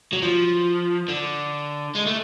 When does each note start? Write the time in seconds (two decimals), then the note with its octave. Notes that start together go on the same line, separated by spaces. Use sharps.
0.13 F#3
0.22 F3
1.08 D3
1.95 G#3
2.06 A3